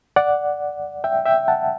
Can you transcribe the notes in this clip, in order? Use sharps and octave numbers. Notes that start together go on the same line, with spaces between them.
D5 F#5
E5 G5
E5 G5
F#5 A5